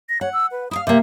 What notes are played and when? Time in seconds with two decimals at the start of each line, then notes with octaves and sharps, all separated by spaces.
0.09 A#6
0.21 C#5 F#5
0.33 E6
0.52 B4
0.71 E4 F5 D#6
0.87 C3 A#3 E5